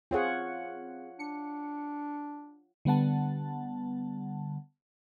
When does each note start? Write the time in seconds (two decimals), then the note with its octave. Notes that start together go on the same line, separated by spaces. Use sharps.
0.11 C4 F4 G#4 C#5 F#5
1.19 D4 C#7
2.85 D3 G3 B3 F#5 A5